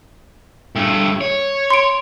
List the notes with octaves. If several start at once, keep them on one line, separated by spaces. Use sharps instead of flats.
G2 A3
C#5
C6 D7